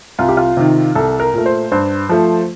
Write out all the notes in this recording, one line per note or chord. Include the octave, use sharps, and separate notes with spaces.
C2 F4
G4
F4
C3 D#3
C2 A4
A#4
A#2 A3
C5
G2 C5
F3 A3